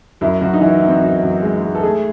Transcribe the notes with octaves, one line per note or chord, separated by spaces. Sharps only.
F#2 E4
F#2 F#4
D#4
E3 E4
E3
C4
F#2 F#4
F#2
G#3
G#3
A4
A3 G#4